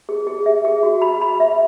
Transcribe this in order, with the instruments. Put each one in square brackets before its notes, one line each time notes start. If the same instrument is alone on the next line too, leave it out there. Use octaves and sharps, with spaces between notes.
[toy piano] G#4
G#4
E5
G#4
F#4
B5
B5
E5